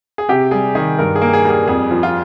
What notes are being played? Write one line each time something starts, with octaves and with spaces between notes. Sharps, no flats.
G#4
C3 G4
G3 G#4
D#3 G#4
G2 A#4
G#4
A#3
G#4
G3
G#4
F2 G#4
F3
F4